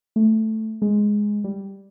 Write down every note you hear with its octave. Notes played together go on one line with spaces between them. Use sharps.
A3
G#3
G3